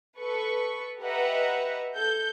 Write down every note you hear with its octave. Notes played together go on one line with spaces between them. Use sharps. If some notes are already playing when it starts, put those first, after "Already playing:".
A4 B4 C#6
G4 B4 D#5 E5 F#5 A#5
A4 G6